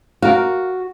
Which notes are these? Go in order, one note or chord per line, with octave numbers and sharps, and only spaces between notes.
F#4 A#4 F5